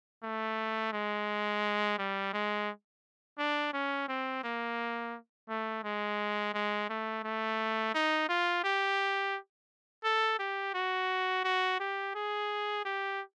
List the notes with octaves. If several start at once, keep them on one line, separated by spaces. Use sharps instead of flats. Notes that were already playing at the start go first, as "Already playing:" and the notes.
A3
G#3
G3
G#3
D4
C#4
C4
A#3
A3
G#3
G#3
A3
A3
D#4
F4
G4
A4
G4
F#4
F#4
G4
G#4
G4